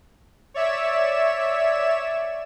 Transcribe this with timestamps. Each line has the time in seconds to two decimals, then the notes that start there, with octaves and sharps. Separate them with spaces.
0.54 C#5 D5 E5 E7